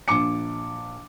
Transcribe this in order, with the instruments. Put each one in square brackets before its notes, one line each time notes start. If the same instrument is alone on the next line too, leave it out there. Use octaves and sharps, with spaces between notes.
[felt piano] A#1 D6 C#7